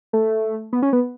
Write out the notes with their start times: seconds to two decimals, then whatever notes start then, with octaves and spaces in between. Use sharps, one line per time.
0.13 A3
0.73 B3
0.82 C#4
0.93 B3